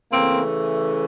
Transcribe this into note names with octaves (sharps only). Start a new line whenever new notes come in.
C#3 E3 A3 A#3 C4